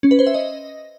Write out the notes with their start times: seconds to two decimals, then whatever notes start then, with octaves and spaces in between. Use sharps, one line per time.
0.03 C#4
0.11 B4
0.19 C5
0.27 E5
0.34 D#5